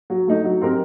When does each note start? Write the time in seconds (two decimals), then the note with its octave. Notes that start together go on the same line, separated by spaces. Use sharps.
0.10 F#3
0.27 A3 D#4
0.44 F#3
0.62 C4 D#4 G4 A#4